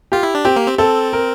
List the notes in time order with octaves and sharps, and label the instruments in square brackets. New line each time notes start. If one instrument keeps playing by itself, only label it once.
[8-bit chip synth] F4 [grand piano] G4
[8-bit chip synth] E4
D4
[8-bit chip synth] C4 [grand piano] G4
[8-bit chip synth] A#3
C4
[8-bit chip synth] C4 [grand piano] A4
[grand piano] A#4